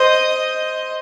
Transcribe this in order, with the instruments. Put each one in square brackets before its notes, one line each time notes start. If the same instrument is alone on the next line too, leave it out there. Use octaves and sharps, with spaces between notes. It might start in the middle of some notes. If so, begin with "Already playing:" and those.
Already playing: [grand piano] C5 [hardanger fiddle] D#5